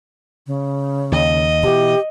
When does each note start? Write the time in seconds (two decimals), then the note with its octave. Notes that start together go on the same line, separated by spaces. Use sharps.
0.47 C#3
1.12 D#2 D#5
1.63 B2 E3 G4